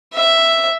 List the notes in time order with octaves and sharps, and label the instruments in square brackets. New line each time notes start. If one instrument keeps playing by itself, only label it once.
[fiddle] E5